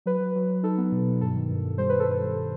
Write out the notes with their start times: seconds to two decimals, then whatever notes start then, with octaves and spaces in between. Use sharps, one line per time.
0.06 F#3 B4
0.20 F#3
0.35 F#3
0.49 F#3
0.63 D#4 A4
0.78 B3
0.92 B2
1.07 B2
1.21 G2 A4
1.35 D#3
1.50 G2
1.64 G2
1.78 G3 C5
1.89 G3 B4
2.00 A4
2.07 G2 B4
2.21 G3